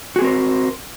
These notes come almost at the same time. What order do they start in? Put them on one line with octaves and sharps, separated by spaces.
F#4 G#4 C4 A#4 C5